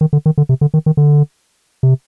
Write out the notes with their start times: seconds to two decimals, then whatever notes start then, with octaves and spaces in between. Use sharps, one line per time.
0.01 D#3
0.13 D3
0.26 D#3
0.38 D3
0.49 C3
0.61 D3
0.74 D#3
0.86 D#3
0.97 D3
1.83 C3